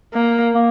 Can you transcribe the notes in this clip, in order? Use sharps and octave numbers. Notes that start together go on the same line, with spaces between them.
A#3
A#3